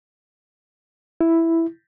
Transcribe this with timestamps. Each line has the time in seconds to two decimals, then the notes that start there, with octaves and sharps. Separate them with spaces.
1.21 E4